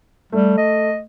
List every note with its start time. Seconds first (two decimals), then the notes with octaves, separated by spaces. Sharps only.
0.32 G3 A3
0.57 D#5